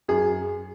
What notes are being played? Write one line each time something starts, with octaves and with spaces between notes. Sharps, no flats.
F#2 G#4